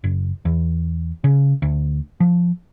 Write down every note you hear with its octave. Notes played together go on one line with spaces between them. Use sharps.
F#1
E2
C#3
D2
F3